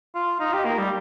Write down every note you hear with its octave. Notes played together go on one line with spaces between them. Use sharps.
F4
D#4
G4
A#3
G3